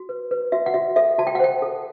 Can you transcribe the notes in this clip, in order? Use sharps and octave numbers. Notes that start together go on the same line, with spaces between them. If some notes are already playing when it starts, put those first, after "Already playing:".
Already playing: F#4
B4
B4
F#4 E5
F#5
F#4 E5
A4 E5
F#4 A5
G5
F#5
C5 G5
A4